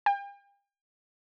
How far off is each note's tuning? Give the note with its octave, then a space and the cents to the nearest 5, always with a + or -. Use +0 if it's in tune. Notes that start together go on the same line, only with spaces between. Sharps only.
G5 +40